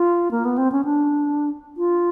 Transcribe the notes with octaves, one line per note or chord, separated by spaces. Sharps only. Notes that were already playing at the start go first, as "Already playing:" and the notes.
Already playing: F4
A#3
B3
C4
C#4
D4
F4